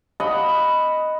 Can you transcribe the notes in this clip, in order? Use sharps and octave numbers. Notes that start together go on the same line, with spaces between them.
D#5 F#5 B5